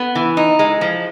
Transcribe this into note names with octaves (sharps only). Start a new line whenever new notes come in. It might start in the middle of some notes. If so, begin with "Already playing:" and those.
Already playing: B3
E3
D#4
G#3
F3